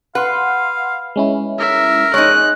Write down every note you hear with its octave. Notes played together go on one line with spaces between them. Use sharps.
B4 F5 F#5 C6
G#3 C#4 E4
A#4 E5
G#3 D#4 C#5 F#6